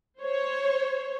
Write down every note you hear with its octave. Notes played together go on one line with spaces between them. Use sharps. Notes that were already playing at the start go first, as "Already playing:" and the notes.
C5 C#5